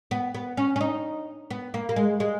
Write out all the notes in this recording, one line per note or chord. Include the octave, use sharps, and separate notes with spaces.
B3
B3
C#4
C#4
D#4
B3
A#3
A#3
G#3
G#3